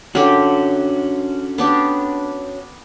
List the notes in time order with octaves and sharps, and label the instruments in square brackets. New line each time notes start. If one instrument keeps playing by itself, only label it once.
[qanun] D3 G4 [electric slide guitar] C#4 F#4
[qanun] B3 D4 G4